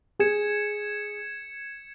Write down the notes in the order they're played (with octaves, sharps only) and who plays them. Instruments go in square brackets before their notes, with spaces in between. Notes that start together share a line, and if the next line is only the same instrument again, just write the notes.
[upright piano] G#4 [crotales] G#6 C#7 E7